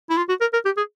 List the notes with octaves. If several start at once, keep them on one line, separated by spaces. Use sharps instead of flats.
E4
F4
F#4
A#4
A#4
G4
G#4